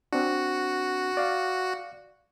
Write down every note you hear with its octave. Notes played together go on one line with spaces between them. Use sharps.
C4 D4 F#4
D5 F5